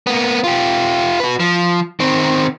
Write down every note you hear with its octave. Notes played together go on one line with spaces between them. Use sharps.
A#3 B3
F4 G4
F#4 B4
F3
D#3 C4